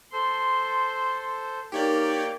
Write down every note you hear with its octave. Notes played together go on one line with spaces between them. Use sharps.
A4 C5 C6
A#3 D#4 G4 A#4 C#5 D5 G5